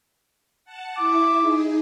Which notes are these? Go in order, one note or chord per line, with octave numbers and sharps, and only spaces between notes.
F#5 A5
E4 E5 D6
D#4 G#4